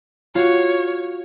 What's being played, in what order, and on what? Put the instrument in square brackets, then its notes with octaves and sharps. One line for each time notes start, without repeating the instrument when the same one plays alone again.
[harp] F4 F#4 [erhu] C#5